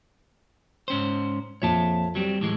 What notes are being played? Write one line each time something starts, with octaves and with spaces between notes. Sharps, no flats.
G#2 C#4 C5
A#1 F2 C#5 E5 A5
F#3 G3 C4 G4
A2 E3 G#3